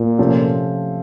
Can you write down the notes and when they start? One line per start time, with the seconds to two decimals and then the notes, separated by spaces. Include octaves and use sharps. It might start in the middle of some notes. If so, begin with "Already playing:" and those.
Already playing: A#2
0.19 C3 F3 A3 C#4